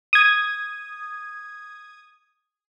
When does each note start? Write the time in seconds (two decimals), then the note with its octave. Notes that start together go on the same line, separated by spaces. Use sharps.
0.13 D#6 G#6